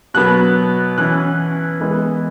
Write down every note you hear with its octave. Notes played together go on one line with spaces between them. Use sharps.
B2 F#3 B3 F#6
E3 C#4 F#6
E3 G#3 B3